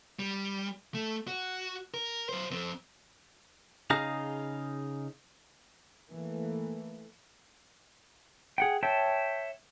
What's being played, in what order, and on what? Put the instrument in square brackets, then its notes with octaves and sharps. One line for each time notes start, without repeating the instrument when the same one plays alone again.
[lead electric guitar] G3
A3
F#4
A#4
F#3 C5
F2 C4
[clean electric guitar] C#3 D#4 G#4 F5 A#5
[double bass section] E3 A3 A#3
[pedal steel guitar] G#4 F#5 G5
C#5 E5 G5 A5